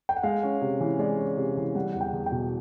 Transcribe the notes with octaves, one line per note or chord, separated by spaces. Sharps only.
G5
F#5
G#3 F5
C#4
C3
E3
G#3 D5
C#4
C3
E3
G3 F#5
E2 F#5
G5
E2
G5
B2